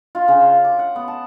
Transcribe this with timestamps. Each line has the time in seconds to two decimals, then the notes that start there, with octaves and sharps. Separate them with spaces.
0.15 F4
0.28 C#3
0.40 C6
0.64 D6
0.79 F#5
0.96 B3
1.08 A5